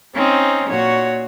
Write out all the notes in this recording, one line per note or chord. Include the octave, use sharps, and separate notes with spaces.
C4 C#4 D#4
A#2 F#4 C#5